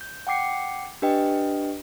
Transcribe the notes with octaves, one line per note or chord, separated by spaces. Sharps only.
G6
F#5 G5 D6 C7 C#7
D4 G4 B4 D#5 G5